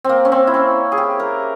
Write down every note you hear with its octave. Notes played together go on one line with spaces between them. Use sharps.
A#3 C4
C#4
C4
E4
C#4
G#4
G4
A#4